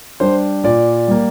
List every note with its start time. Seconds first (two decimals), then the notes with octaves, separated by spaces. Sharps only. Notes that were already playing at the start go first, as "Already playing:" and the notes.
0.20 G3 D4 C5
0.64 A#2 D5
1.08 G3 A#3